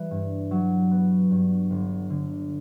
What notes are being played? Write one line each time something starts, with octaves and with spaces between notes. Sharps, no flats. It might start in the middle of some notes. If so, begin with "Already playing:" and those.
Already playing: E3 G3
G2
F#3
B3
G2
G1
D3